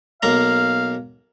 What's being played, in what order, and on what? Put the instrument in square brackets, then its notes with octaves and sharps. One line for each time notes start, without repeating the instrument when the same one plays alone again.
[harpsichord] B1 A#3 A#5 [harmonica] F5